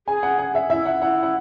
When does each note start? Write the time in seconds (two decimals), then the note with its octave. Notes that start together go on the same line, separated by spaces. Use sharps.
0.07 G#4 G#5
0.23 F#5
0.39 F#5
0.55 E5
0.70 E4 E5
0.85 F#5
1.02 E4 F#5
1.23 F#5